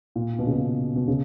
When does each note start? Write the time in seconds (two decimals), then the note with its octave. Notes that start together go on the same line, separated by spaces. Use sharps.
0.16 A#2
0.39 B2
0.47 C#3
0.56 B2
0.96 B2
1.08 C#3